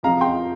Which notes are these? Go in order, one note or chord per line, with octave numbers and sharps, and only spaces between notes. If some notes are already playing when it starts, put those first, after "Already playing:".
F2 C3 F3 F5 A#5
G5 C6